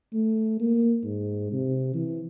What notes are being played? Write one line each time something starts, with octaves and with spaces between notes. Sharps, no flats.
A3
A#3
G#2
C3
E3